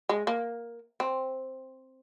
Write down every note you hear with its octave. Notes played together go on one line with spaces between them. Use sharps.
G#3
A#3
C4